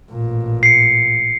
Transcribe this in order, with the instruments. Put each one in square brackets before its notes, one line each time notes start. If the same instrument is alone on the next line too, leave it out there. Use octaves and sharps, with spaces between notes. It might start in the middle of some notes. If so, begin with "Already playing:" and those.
[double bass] A1 A#2
[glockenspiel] C7 C#7